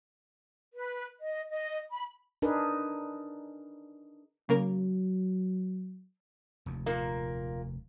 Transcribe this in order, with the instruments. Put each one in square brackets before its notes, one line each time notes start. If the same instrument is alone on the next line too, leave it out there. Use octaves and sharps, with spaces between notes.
[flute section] B4
D#5
D#5
B5
[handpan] D4 D#4 G#4 A#4 B4
[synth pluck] C#3 A#3 A#4 [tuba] F#3
[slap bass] F1 D#2
[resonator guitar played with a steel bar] A#2 A#3